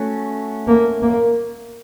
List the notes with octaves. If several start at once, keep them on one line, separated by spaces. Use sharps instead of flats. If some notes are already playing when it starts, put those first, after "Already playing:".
Already playing: A3 C#4 F#4
A#3
A#3